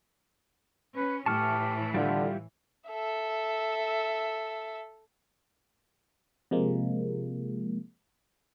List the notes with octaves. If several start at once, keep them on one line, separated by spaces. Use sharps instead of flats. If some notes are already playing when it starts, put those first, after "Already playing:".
C#4 B4
A2 E3 G4 A5 C#6 F6
D3 G3 E4 F4 G4
A4 E5
C3 F3 G#3 A#3